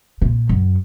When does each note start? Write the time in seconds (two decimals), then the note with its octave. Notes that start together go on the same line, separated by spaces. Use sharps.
0.21 A#2
0.49 F#2